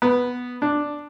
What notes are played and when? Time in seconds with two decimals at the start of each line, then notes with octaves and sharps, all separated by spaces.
0.02 B3
0.62 D4